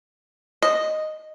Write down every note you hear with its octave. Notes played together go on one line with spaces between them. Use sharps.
D#5